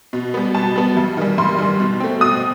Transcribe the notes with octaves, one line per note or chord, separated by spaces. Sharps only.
B2
G3 B3
B2 A5
G3 B3
G2
D#3 G3
G2 C6
D#3 G3
B2
A3 C4
B2 D#6